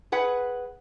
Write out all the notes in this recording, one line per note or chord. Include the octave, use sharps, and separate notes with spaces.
G#4 B4 F#5